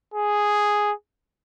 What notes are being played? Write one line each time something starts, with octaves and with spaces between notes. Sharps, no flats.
G#4